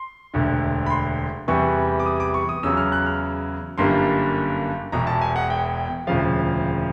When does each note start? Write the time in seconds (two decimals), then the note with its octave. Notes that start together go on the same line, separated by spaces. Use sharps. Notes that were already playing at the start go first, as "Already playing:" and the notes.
Already playing: C6
0.34 E1 D2 D3
0.86 B5
0.90 C6
1.48 E2 C3 E3 G3 B3 C#6
2.00 D6
2.06 D#6
2.20 D6
2.34 C#6
2.49 D#6
2.63 E2 C#3 F#3 E6
2.77 F6
2.92 F#6
3.06 F6
3.78 G1 F#2 D3 G3 A#3 C6
4.92 E1 E2 B2 A#5
5.07 A5
5.21 G#5
5.36 F#5
5.50 G5
6.07 E1 D2 C#3 F3 F5